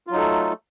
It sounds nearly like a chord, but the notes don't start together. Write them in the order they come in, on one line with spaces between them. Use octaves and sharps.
F4 F#3 D#4 A4 A3